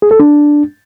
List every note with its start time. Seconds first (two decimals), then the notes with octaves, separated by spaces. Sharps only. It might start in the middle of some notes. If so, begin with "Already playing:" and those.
0.02 G#4
0.11 A4
0.19 D4